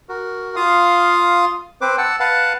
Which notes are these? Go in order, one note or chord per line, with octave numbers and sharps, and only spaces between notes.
F#4 A#4
F4 F5 C6 D#6
C4 B4 C5 D6
F#5 A5 E6
B4 F5 F#5 A5